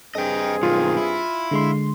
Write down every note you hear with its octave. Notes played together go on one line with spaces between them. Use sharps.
G2 C4 G#4 D#5 G5
B1 D#3 F4
E4
D3 G#3 C6